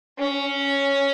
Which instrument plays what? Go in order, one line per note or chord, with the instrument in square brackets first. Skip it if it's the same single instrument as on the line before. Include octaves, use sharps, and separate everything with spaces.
[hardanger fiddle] C#4